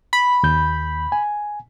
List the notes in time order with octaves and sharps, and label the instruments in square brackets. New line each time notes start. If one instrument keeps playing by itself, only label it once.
[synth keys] B5
[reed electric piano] D#2 G6
G#5